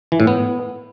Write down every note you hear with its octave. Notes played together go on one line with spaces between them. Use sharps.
E3
A2
B3